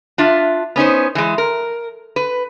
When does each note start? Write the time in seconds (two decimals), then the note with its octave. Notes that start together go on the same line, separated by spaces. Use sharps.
0.18 D4 F4 E5
0.76 B3 C#4 D#4 C5
1.15 E3 G#3
1.38 A#4
2.16 B4